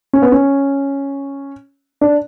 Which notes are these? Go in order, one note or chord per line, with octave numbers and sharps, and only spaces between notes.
C#4
B3
C#4
D4